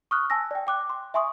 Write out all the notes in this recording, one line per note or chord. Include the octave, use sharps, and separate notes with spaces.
C#6 D#6 F6 F#6
G#5 A5 E6 A#6
D5 G5
G5 D6 F#6
C6
E5 G#5 C6 C#6 D#6